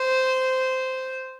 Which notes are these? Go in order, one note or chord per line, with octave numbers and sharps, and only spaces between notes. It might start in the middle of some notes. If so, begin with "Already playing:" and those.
Already playing: C5